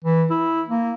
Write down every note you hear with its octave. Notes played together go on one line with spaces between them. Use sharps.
E3
E4
A#3